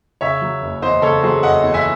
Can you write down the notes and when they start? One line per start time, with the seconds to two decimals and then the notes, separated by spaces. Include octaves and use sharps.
0.21 C#3 C#5 E5
0.41 F#3
0.62 F#1
0.82 E2 C5 D#5
1.02 C#3 A4 C#5
1.23 F#3 G#4 C5
1.43 F#1 D#5 F#5
1.63 E2
1.74 E5 G#5